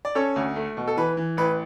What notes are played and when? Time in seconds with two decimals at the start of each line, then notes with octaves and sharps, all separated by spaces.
0.05 D5
0.15 C#4 A4 C#5
0.36 D2
0.56 A3
0.77 B2
0.88 A4
0.97 E3 B4
1.17 E3
1.37 A1 B4